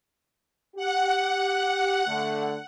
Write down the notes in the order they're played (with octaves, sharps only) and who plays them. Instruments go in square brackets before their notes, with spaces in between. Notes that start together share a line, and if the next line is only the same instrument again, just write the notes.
[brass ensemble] G4 [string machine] F#5
[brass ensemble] D3 A3